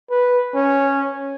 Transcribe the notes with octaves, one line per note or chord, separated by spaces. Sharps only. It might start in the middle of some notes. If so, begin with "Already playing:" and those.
B4
C#4